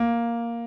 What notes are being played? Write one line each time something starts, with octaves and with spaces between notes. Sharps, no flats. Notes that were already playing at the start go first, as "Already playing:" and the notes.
Already playing: A#3